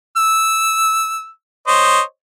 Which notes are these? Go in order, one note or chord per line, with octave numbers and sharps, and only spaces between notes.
E6
C5 C#5 D#5